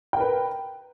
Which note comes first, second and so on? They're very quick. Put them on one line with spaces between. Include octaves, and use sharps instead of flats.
G5 A#4 B4